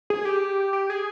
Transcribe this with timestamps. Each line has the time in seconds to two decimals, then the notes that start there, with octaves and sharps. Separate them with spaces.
0.10 G#4
0.25 G4
0.73 G4
0.90 G#4